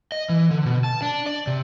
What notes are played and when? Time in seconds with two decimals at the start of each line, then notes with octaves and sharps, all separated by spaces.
0.12 D#5
0.29 E3
0.51 D3
0.66 B2
0.84 A5
1.02 D4
1.26 D5
1.47 C3